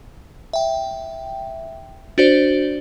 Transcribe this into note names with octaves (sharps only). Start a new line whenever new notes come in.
E5 G5
D4 F#4 C5 D5